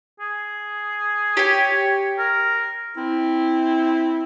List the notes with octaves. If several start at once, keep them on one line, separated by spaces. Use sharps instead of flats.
G#4
G4 C#5 G#5
A#4
C4 E4